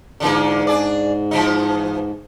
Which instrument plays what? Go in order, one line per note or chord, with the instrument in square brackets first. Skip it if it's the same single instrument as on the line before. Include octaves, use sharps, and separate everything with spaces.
[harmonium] G#2 [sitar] D3 E3 A#3
[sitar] D4 G#4 D5
E3 F3 D#4